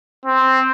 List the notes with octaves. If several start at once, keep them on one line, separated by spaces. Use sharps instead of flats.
C4